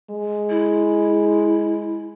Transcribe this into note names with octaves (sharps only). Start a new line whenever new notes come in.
G#3
E4